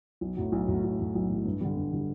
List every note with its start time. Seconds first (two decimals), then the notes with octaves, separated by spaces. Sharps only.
0.21 B1
0.37 A2 F#3
0.52 B1
0.68 A2 F#3
0.84 B1
0.99 A2 F#3
1.15 B1
1.30 A2 F#3
1.45 G2
1.61 D3 G3
1.77 G2
1.92 D3 G3